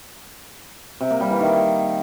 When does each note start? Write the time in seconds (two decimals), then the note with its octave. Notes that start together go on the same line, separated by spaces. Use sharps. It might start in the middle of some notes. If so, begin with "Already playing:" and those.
1.00 C3
1.10 A#3
1.20 G3
1.30 E3
1.40 D#3